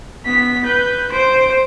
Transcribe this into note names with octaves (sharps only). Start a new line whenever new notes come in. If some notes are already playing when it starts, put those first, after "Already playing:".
B3 B6
B4 G6
C5 D7